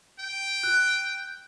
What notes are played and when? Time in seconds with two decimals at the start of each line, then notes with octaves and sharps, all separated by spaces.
0.19 G5
0.63 F#6